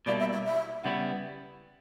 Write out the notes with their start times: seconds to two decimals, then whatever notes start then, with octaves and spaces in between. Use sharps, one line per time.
0.06 B2 G3 A#3 E4 D5
0.19 E5
0.33 E5
0.46 E5
0.83 C#3 G3 B3 E4 F#5